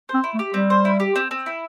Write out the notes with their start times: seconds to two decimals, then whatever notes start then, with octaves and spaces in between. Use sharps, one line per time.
0.09 C4 C5
0.24 E4
0.34 A3
0.39 G4
0.54 G3 C4
0.70 C5
0.85 E4
1.00 G4
1.16 C4
1.31 C4
1.46 E4